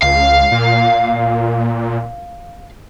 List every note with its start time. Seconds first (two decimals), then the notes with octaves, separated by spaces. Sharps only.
0.02 C#2 F5
0.52 A#2